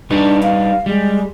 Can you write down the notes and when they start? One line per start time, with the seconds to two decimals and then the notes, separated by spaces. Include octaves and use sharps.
0.11 G3 D4 D#4 B4
0.42 F5
0.86 G3 G#3